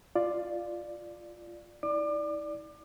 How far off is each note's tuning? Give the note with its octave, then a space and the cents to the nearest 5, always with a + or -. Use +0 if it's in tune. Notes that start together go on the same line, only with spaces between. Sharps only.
F4 +0 D5 +10
E4 -45 D5 +0 D6 +35